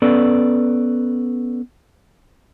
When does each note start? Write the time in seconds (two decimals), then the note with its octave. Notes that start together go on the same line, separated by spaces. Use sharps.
0.02 B3 C#4 A4 B4 D5